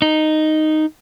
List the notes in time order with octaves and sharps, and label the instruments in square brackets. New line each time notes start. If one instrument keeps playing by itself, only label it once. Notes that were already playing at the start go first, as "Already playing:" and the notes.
[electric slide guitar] D#4